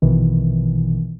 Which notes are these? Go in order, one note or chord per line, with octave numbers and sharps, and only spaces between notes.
A#1 B2 D#3 E3